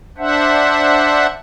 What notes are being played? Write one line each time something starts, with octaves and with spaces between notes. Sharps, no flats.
D4 C5 E5 F#5